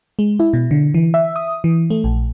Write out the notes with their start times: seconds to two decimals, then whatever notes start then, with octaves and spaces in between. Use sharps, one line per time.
0.19 G#3
0.40 E4
0.53 B2
0.71 D3
0.94 E3
1.14 E5
1.36 D#6
1.64 E3
1.90 A3
2.04 A#1